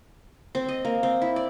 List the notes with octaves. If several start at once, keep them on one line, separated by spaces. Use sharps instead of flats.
C4
D#5
A#3
C4
E4
D5